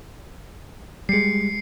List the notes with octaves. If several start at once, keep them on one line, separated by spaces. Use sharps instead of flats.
G3 G#3 C7 C#7